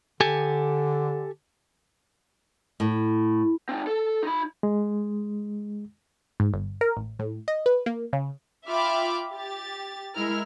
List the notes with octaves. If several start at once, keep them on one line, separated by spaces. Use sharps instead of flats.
D3 G4 A4 G#5
A2
C4 D#4
A4
D#4 B5
G#3
G#2
G1
A#4
A1
A2
D#5
B4
A#3
C#3
F4 E5 G5 B5 D6 F6
G4 A6
G#3 E4 A#4 F6